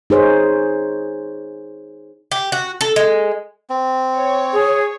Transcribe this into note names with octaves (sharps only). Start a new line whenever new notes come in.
D#4 G#4 C5 C#5
G4
F#4
A4
G#3
C4
C#5
G#4